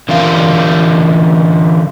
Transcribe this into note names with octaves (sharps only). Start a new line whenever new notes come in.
D3 E3 F4 A#4 F5